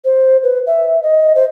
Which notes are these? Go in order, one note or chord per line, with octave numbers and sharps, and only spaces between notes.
C5
B4
E5
D#5
C5